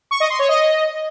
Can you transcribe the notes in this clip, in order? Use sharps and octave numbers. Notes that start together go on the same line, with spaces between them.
C#6
D#5
C6
C#5
D#5